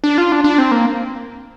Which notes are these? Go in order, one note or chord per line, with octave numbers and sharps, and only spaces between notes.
D4
F4
D4
D4
C4
A#3